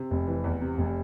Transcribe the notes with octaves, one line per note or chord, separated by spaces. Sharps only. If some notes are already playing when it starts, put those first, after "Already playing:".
Already playing: C3
F1
E3
E2
C3
F1